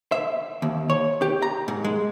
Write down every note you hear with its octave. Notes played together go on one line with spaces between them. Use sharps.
E5
D#2
C#5
G4
A#5
G#2
G#3